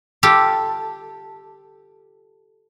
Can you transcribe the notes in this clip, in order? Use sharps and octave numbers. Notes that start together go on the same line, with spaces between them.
F4 G4 A4